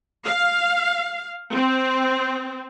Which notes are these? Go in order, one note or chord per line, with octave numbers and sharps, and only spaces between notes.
F5
C4